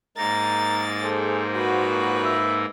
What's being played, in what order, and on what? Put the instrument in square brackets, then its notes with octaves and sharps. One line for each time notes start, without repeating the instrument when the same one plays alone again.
[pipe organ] G#2 A#3 D#4 [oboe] A#4 [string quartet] A6
[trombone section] G#4 A4 [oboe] C5
[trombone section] A#2 F3 F#4 [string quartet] B4
[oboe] E5